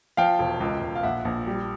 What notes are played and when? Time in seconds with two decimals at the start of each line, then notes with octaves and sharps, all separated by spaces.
0.17 F3 F5 G5
0.39 E1
0.61 C#2
0.82 C#2
0.95 F5
1.03 A#1 E5 F#5
1.25 A#1
1.47 G3